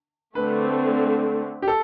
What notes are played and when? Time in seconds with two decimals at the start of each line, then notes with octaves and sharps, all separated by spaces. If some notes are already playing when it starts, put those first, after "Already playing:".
0.35 D3 A3 C4 B4
1.62 G4
1.68 A4